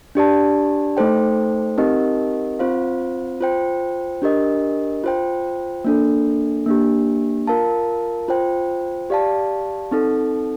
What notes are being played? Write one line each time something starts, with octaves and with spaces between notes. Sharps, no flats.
D4 G4 D5 A5
A3 D#4 A4 C5 G5
C4 D#4 G4 A#4 D#5
C4 F4 C5 F5
F4 C5 G5
D4 G4 A#4 D#5
F4 C5 G5
A#3 D4 A4
A#3 D4 G4
F4 A#4 F5 A5
F4 C5 G5
G4 D5 F5 A5
C4 D#4 A4